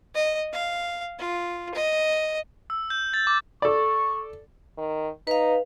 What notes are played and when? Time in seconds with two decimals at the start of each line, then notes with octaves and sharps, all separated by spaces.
0.14 D#5
0.53 F5
1.18 F4
1.74 D#5
2.70 E6
2.90 G6
3.14 A6
3.27 D6
3.62 A4 D5 C#6
4.78 D#3
5.27 D#4 B4 F5